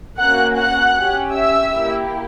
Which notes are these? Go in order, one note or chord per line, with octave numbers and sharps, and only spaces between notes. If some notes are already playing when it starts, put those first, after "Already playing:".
A#3 C#4 F#4 F#5 F#6
F#5 F#6
C#4 G4
E5 E6
A#3 E4 G4